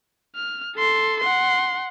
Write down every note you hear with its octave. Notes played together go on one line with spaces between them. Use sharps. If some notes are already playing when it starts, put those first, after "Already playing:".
F6
A4 C6
F#5 C6